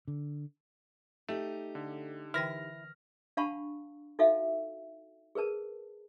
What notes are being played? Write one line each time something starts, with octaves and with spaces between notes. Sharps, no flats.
D3
A3 D#4 G4
D3
D3 E3 E4 G5 F6 A#6
D4 F5 F#5 A5 B5 C#6
D#4 F#4 A4 E5 F5
G#4 A#4 B4 A5